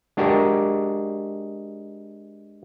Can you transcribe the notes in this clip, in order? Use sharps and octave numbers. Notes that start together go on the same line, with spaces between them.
G#3 D4 F#4 G4 A#4